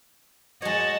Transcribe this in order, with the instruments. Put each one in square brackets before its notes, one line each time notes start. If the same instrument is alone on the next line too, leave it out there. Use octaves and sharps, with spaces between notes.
[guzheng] G#3 C#5 [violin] F#4 A5 [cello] D#5